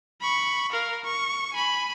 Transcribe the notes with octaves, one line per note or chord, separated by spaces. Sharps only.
B5 C#6
A#4 F5
C#6
G#5 B5